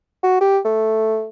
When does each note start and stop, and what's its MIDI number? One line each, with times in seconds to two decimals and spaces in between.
0.23 0.39 66
0.41 0.59 67
0.65 1.27 57